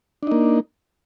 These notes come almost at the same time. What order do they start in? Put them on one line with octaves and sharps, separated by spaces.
D4 D#4 A#3